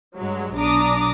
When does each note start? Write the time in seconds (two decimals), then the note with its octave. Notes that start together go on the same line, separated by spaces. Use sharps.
0.17 G2 F#3 G#3
0.57 B1 D4 A#5 D6 D#6